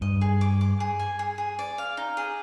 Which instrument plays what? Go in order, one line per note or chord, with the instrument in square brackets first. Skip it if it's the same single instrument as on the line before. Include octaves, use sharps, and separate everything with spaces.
[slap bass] G2 [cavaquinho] D#5
[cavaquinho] G#4
D6
D6
G#4
G#5
G#4
G#4
D5
F5
D#4
G#4